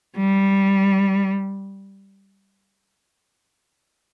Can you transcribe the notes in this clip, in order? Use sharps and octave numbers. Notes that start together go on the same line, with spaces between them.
G3